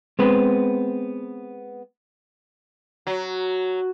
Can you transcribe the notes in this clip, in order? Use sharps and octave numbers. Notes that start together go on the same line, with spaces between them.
G#3 B3 C4 B4
F#3